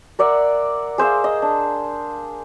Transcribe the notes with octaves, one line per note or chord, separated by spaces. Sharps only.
A#4 D5 E5 F#5
G#4 C5 E5 F5
D#5
D4